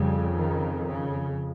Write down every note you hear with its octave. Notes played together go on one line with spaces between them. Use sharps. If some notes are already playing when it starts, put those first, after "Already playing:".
Already playing: F2 C#3 G3
D#3
C#3